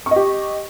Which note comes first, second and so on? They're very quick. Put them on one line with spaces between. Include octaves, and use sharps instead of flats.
C#6 D#5 G4